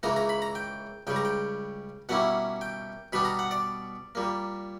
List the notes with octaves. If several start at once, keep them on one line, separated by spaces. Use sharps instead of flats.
C#2 C#3 E3 A#3 A#5
A#5
B5
A#5
G5
C#2 C#3 G3 G5
A#5
G5
B2 G3 A#3 C#4 E4 F#5
G5
B2 G3 B3 D4 B5
A#5
F#5
D5
A#2 G3 A#3